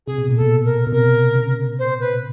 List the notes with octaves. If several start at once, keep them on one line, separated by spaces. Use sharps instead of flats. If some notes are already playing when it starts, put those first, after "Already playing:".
C3 G#4
B2
A#2
B2 A4
A#4
B2
C3 A#4
C#3
C5
B4